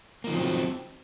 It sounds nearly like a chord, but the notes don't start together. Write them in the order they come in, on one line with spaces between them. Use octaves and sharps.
A#3 F3 D#3 F#3 C4